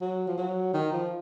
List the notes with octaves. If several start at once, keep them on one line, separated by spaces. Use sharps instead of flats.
F#3
F3
F#3
D#3
F3